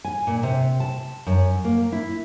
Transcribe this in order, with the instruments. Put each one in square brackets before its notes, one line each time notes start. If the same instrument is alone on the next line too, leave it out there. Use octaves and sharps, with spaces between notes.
[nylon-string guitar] G#5
A#2
C3
A5
F#2
A#3
E4